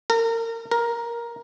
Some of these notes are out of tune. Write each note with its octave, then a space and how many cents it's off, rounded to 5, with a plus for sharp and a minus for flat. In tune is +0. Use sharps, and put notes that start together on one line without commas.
A#4 -30
A#4 +10